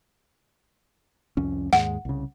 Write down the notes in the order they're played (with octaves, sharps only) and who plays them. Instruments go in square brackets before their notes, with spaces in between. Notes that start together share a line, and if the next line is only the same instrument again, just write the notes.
[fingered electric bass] C2 F2 C#4
[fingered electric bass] D#2 G#2 G#3 [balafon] F#5
[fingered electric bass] C2 C#3